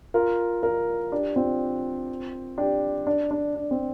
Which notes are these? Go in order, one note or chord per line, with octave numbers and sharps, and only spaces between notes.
F4 A#4
F4 A#4
D4 G4
C4 F4
D4 G4
D4
D4
D4
C4